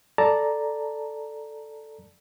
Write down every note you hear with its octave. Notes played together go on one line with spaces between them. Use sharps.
A4 D5 A5 A#5